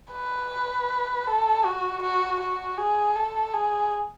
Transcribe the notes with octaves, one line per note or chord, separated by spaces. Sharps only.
B4
A4
F#4
F#4
F#4
G#4
A4
G#4